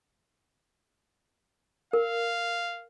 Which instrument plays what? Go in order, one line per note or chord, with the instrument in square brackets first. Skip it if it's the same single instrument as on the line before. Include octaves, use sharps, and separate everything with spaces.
[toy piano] A#4 [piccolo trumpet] F5